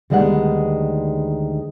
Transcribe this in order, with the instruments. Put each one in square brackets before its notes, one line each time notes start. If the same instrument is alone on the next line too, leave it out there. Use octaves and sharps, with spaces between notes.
[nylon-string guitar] D2 D#3 G3 G#3 B3 F#5